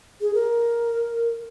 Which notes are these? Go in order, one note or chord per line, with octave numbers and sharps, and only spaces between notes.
G#4
A#4